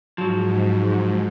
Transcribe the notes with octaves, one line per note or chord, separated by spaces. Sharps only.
G#2 F3 F#3